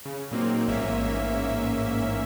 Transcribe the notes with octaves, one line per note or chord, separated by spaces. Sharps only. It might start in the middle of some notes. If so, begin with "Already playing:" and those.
C#3
A#2 F#3 A#3 C4 D#4
A1 G#2 A#3 C#4 E5